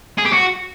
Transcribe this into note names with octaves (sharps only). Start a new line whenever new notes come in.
G#4
G4
F#4